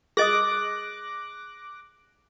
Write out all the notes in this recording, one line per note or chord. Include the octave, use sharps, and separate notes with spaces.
G#4 D#5 D6 D#6 F#6 A#6